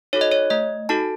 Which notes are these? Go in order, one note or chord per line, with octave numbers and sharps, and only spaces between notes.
D#4 F#4 A4 C#5
D#5
C#5
A3 D#5
D#4 F#4 A4 A5